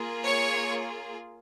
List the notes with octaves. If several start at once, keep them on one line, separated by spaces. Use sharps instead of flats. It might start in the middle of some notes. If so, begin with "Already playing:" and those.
Already playing: A#3 F4 G#4
C#5